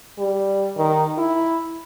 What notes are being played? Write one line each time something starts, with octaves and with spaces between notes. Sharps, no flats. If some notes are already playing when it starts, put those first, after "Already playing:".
G3
D#3
E4